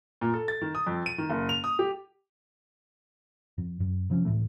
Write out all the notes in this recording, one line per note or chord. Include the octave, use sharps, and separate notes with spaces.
A#2
A4
A6
D#3
D#6
F2
D#7
D#3
F#1
F7
D#6
G4
F2
F#2
C3 F3 C4 C#4
C#2 A2 E3 A3